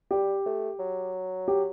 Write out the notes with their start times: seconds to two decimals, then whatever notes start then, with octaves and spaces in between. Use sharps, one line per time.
0.11 G3 G4
0.46 A3
0.79 F#3
1.48 G4